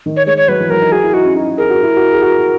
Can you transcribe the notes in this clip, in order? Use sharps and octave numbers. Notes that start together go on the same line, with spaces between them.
D#3
C#5
G#3 C#5
C#5
F#3 B4
E3
F#3 A#4
D#4
F#4 G#4
E4
D#4 F#4
C#4
D#4
G#4 A#4
F#4
E4
F#4
G#4
F#4